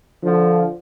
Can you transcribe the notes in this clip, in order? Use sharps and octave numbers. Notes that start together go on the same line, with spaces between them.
D3 F3